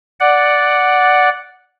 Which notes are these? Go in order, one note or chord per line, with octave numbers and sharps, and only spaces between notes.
D5 F#5